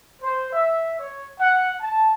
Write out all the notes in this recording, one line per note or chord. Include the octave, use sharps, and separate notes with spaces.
C5
E5
C#5
F#5
A5